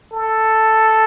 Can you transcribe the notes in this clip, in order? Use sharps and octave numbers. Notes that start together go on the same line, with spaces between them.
A4